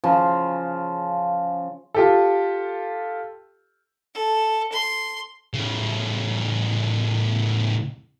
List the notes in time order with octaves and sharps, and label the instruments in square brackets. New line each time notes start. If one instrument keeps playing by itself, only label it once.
[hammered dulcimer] C#3 F3
[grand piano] F4 G4 A4
[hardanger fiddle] A4
C6
[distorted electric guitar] A2 C#3